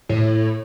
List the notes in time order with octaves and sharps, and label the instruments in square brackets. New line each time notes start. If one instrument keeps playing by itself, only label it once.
[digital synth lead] A2